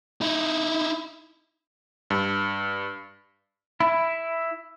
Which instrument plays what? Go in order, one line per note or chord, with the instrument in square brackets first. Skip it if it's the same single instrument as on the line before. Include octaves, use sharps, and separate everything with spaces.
[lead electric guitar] D#4 E4
[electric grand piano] G2
[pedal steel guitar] E4